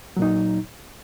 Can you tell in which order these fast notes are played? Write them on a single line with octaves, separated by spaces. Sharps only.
F#3 A#2 D#4